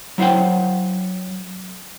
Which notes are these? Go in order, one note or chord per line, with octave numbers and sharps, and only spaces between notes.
F#3 E4 C5 F#5 G5